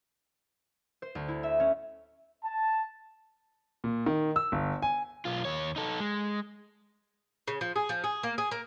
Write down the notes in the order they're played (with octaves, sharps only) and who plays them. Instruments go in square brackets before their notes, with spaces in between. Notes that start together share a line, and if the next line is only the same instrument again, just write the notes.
[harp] C5
D2
E4
E5
C#4
[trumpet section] A5
[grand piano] A#2
D#3
E6
G1
G#5
[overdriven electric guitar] B1 F4
D#2 C#5
D#4 A4
G#3
[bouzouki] C#3
F3
G#4
F3
G#4
A#3
G#4
A#3